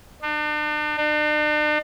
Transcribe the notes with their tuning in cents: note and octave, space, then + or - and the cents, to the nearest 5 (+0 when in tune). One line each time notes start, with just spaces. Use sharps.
D4 +40
D4 +45